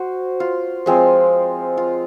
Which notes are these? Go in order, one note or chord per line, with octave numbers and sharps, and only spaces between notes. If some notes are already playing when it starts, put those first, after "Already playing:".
Already playing: F#4 C5
F4
F3 G#3 C4 F4
F4